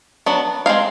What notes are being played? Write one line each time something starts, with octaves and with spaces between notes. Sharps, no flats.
F#3 B3 D4
G#3 C4 D#4 F5